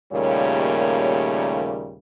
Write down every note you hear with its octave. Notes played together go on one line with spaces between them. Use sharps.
D#2 A#2 C#3 G3 A3 C#5